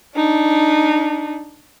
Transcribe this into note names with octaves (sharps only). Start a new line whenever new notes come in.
D4 D#4